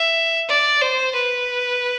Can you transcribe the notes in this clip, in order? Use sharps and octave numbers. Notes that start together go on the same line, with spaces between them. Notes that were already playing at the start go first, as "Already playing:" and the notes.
Already playing: E5
D5
C5
B4